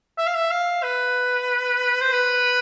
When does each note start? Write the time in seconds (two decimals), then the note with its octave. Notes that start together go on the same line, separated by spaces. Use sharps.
0.18 E5
0.26 F5
0.35 E5
0.51 F5
0.83 B4
2.01 C5
2.12 B4